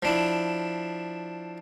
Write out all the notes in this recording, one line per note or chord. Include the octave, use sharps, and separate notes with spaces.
F3 D4 E4